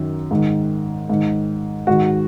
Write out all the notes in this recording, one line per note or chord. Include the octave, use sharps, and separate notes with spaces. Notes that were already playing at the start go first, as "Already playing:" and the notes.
Already playing: F#2 D#3
G#2 D#3
G#2 D#3
G#2 D#3 F#4